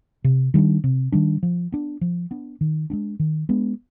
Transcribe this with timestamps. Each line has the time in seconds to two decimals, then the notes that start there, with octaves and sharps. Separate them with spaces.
0.24 C3
0.54 D#3 G3 D4
0.84 C3
1.12 D#3 G3 D4
1.43 F3
1.72 B3 D4
2.01 F3
2.31 B3 D4
2.61 D#3
2.90 G#3 B3 D4
3.19 D#3
3.49 G#3 B3 D4